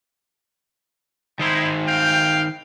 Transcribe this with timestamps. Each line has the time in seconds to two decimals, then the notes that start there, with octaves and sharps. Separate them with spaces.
1.39 D#3 G#3 D#4 E4 C5
1.86 F5 G5